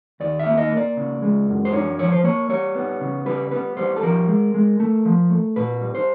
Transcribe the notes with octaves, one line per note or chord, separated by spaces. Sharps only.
D#2 D5
E5
A#3
D#5
A#3
D5
C#3
G#3
F#2
C5
D4 C#5
F3 C#5
C5
A#3 C#5
G3 C#5
B3
C#3
G3 B4
B3 B4
G3 C5
A4
F3 A#4
G#3
G#3
A3
F3
A3
A#2 B4
G3
C5